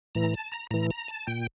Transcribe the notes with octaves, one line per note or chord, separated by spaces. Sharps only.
A2 E3 A#5
A5
A#5
A2 E3 A#5
A#5
A5
A#2 G5